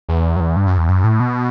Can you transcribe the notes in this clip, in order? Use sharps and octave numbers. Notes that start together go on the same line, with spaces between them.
E2
F#2
E2
G2
F#2
E2
F#2
A2
B2